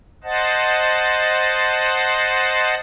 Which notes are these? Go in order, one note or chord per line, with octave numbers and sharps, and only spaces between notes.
C5 D#5 F#5 A5